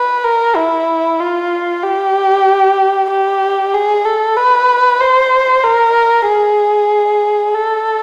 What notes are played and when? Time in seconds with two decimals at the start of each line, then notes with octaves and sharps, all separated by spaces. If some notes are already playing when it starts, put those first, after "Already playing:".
Already playing: B4
0.24 A#4
0.56 E4
1.20 F4
1.83 G4
3.10 G4
3.74 G#4
4.05 A4
4.37 B4
5.01 C5
5.64 A#4
6.28 G#4
7.55 A4